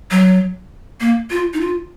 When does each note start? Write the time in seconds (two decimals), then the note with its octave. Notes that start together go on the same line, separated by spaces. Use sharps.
0.11 F#3
1.00 A#3
1.31 F4
1.54 D#4
1.61 F4